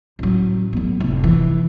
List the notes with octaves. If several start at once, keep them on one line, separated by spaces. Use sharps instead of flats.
A1 F#3
A2 B3
F1
E3